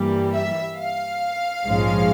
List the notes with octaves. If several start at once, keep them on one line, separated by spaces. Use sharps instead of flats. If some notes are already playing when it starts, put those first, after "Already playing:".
Already playing: G2 E3 G3 A#3
E5
F5
A#1 G#2 F3 G#3 C#4